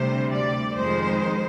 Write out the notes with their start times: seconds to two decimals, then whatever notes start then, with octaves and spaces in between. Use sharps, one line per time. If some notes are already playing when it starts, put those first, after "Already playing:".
Already playing: D2 C3 G3 C5
0.32 D5
0.76 F2 D#3 G#3 C5